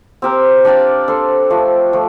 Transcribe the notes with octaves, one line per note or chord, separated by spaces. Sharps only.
C4 G4 A#4
D4 G4 D5 F5
D4 A4 C5
F3 A3 D4
F3 A3